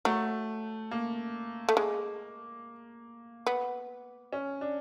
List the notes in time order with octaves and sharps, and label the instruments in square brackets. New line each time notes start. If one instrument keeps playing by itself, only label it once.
[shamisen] F#3 [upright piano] A3
[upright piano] A#3
[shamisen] A3
G#3
B3
[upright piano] C#4
D4